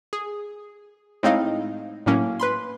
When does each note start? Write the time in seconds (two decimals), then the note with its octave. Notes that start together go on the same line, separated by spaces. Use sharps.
0.13 G#4
1.23 A2 G#3 C4 D#4 D#5 F5
2.06 A2 F#3 A#3 C#4
2.40 B4 B5 C6